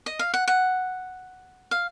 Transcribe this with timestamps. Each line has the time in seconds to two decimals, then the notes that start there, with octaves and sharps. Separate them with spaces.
0.06 D#5
0.19 F5
0.34 F#5
0.48 F#5
1.71 F5